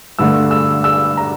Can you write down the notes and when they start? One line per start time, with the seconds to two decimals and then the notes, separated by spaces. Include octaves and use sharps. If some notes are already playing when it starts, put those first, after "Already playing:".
0.19 G2 D3 A3 E6
0.51 E6
0.84 E6
1.17 A#5